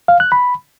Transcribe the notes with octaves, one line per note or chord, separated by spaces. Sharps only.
F5
F#6
B5